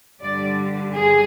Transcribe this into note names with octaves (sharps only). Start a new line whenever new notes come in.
G2 D3 G3 D5
G#4